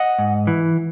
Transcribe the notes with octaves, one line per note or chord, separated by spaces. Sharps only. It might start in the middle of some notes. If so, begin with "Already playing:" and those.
Already playing: D#5 F#5
G#2
E3